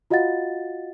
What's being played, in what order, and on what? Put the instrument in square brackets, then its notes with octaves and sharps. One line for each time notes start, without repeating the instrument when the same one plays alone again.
[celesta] F4 F#4 D#5 F5 F#5 A6